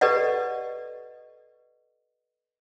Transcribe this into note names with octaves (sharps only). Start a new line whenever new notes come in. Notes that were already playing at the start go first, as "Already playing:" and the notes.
G4 A4 B4 D5 D#5 F#5